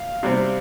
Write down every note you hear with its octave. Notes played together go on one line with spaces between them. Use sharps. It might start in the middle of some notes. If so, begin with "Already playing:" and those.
Already playing: F5
C3 G3 C4